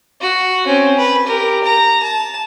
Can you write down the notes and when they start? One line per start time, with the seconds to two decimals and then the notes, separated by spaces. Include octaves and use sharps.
0.21 F#4
0.66 C4 C#4
0.98 B4
1.27 G4 A#4
1.65 A#5
2.03 A5